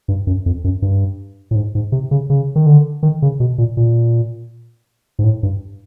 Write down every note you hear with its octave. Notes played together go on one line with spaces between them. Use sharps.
G2
F#2
F2
F#2
G2
A2
G#2
G#2
C3
C#3
C#3
D#3
D3
D#3
C#3
B2
A#2
A#2
G#2
A2
G2